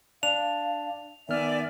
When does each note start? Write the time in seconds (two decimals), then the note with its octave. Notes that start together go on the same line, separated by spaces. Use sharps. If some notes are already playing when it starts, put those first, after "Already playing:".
0.23 D4 F5 F7
1.29 D#3 B3 D5 E5 G#5 F6